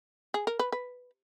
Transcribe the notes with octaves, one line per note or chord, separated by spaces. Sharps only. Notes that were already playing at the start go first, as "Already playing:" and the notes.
G#4
A#4
B4
B4